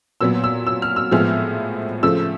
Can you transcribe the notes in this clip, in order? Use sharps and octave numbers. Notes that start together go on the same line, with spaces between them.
A#2 F#3 B3 E6
E6
E6
F6
E6
A2 F3 G#3 B3 F6
C#3 F3 A3 E6